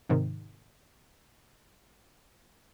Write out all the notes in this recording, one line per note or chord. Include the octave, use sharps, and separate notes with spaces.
G#2 C3 D#3